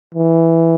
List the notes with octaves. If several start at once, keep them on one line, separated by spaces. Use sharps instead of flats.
E3